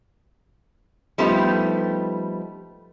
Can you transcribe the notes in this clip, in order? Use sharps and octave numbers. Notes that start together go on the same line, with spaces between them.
F3 G3 A3 B3 D#4 G4